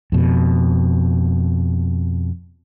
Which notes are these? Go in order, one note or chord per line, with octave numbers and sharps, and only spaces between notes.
F2 B2